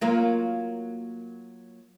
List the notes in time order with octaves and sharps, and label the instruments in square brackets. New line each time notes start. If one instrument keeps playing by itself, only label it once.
[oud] F#3 A#3 F4